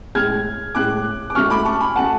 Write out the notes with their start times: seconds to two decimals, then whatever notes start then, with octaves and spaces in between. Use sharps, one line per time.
0.15 A2 G#3 F6 G#6
0.75 A2 G#3 D6 F#6
1.30 D6
1.35 G#2 F#3 A3 C#6 F6
1.50 B5 D6
1.65 A5 C#6
1.81 G#5 B5
1.96 F#3 A3 F#5 A5